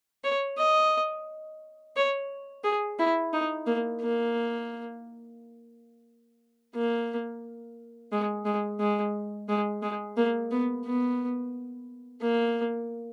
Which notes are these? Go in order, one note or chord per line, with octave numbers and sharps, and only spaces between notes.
C#5
D#5
C#5
G#4
E4
D#4
A#3
A#3
A#3
G#3
G#3
G#3
G#3
G#3
A#3
B3
B3
A#3